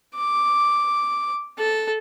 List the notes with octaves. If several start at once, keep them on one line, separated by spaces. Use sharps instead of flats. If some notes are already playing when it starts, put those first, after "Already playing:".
D6
A4